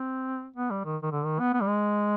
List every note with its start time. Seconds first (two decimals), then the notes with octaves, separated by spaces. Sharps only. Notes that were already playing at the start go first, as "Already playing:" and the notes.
Already playing: C4
0.56 B3
0.71 G3
0.84 D#3
1.02 D#3
1.12 D3
1.25 D#3
1.40 B3
1.54 B3
1.61 G3
1.67 G#3